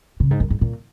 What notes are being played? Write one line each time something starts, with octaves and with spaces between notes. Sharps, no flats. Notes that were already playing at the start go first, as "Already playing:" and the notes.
C#3
G#2
F#2
G#2
A#2